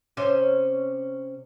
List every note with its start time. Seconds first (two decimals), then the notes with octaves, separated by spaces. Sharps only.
0.17 C3 C#4 C5